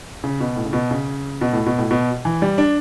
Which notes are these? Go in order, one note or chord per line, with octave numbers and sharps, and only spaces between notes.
C#3
B2
A2
C#3
B2
C#3
B2
A2
B2
A2
B2
E3
G3
D4